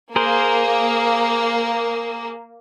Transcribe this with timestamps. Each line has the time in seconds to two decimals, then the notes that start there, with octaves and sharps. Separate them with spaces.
0.16 A#3 G#4 A#4 C5